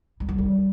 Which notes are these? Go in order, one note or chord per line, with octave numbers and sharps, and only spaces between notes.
G3
F#3
G3